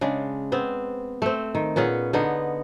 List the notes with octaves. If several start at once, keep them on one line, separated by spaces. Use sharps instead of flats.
C#3 G#3 D4
B3 C4
A3 C4
D#3
A#2 B3 C#4 G#4
D3 B3 D#4